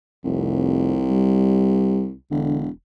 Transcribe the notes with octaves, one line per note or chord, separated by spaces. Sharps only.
F1 C2
G3
E1 D3